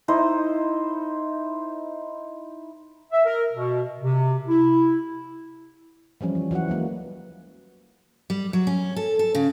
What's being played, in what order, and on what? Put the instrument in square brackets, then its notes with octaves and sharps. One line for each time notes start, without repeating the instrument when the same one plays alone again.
[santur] D#4 E4 C5 D#5
[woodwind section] E5
A#4
B2
C3
E4
[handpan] E3 F3 G3 C#4
E3
E3 F#3 F#4 F#5
F#3 G#3 A#3
[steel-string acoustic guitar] G3
F#3
C#4
A4
A4
C#3